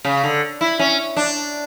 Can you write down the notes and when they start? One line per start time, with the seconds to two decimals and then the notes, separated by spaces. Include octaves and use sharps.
0.05 C#3
0.24 D3
0.61 E4
0.79 C#4
1.17 D4